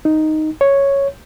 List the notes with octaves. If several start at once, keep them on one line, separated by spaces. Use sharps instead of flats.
D#4
C#5